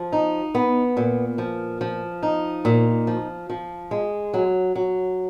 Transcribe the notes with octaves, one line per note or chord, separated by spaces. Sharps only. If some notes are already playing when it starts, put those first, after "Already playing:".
Already playing: F3
D#4
B3
A#2
F3
F3
D#4
A#2
F3
F3
G#3
F#3
F#3